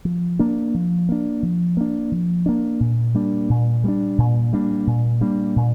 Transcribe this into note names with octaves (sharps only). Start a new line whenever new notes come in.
F3
A#3 D4
F3
A#3 D4
F3
A#3 D4
F3
A#3 D4
A#2
G3 A#3 D4
A#2
G3 A#3 D4
A#2
G3 A#3 D4
A#2
G3 A#3 D4
A#2